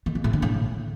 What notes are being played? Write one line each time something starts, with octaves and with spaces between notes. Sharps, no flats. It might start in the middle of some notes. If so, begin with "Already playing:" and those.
D#3
C#3
A2
D3
A2